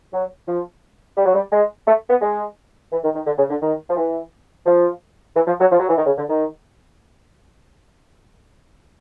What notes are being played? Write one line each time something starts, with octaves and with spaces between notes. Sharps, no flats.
F#3
F3
G3
F#3
G3
G#3
A3
B3
G#3
E3
D#3
D#3
D3
C#3
D3
D#3
F3
E3
F3
E3
F3
F#3
F3
F#3
E3
D#3
C#3
D3
D#3